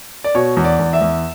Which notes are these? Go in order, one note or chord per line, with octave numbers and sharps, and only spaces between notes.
D5
B2 C#5
E2
D5
E2
E5
E2